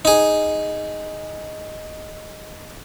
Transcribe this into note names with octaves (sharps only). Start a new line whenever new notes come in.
D#4 G#4